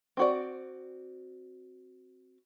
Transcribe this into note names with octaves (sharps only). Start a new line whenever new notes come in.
C4 F#4 D5